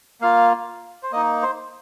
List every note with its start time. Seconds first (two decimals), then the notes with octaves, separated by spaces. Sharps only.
0.21 A#3 F4 F5
1.03 C5
1.12 A#3 D#4 D#5
1.42 C5